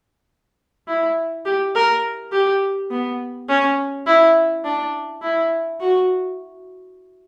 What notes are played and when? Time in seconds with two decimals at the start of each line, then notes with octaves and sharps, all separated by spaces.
0.88 E4
1.45 G4
1.75 A#4
2.32 G4
2.91 B3
3.49 C#4
4.06 E4
4.64 D4
5.22 E4
5.80 F#4